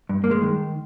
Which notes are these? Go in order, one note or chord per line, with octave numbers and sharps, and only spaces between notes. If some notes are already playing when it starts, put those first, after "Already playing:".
G2
A#3
G#3
D#3